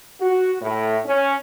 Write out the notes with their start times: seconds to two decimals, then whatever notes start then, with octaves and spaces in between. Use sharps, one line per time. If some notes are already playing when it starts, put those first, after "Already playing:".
0.21 F#4
0.61 A2
1.05 C#4